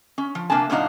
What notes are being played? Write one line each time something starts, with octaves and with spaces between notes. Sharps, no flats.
C#4
F3
C3 A#3 D4 G#5 A5
F#2 A#2 F#3 D4 D#4 F5